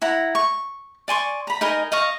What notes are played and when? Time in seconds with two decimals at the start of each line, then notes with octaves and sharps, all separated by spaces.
0.02 E4 F#5 A#5
0.35 C#6
1.08 D5 G#5 C6 C#6
1.47 A#5 B5
1.61 D#4 A#4 D#5 G#5
1.92 D#5 F5 C#6